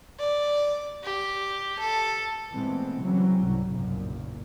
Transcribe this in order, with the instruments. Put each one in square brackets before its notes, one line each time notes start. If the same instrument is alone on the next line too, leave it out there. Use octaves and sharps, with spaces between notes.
[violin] D5
G4
A4
[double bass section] A#2 E3 G#3 A3 B3 C4
C#3 E3 F#3 G3 C4 C#4
C2 G#2 G3
F#1 B1 F#2 A#2